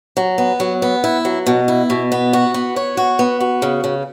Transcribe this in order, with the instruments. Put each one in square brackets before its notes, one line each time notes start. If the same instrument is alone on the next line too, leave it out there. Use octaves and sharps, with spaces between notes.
[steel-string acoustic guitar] F#3
B3
F#3
B3
E4
F#3
B2
E4
B2
B3
F#4
B3
C#5
F#4
B3
F#4
C#3
C#3